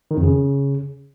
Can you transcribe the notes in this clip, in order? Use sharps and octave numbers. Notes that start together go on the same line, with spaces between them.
D#3
F2
C#3